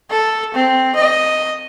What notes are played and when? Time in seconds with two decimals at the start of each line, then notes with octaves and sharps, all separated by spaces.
0.11 A4
0.54 C4
0.96 D#5